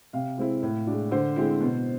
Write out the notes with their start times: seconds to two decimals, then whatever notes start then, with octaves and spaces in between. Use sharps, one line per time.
0.13 C3 F5
0.38 G#3 C4 E4
0.63 A2
0.87 G#3 D4
1.11 D3 C5
1.36 G#3 C4 E4
1.61 B2